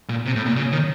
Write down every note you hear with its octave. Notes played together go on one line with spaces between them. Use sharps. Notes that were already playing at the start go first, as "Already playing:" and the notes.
A#2
C3
A2
A#2
C#3
D#3